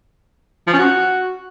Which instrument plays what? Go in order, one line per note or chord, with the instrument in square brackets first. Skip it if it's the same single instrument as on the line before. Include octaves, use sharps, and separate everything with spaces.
[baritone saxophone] F3
C#4
F#4